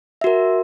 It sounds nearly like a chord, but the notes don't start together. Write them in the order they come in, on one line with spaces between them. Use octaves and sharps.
E5 F#4 A#4